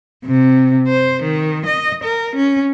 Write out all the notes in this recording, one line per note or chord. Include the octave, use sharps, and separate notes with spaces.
C3
C5
D#3
D#5
A#4
C#4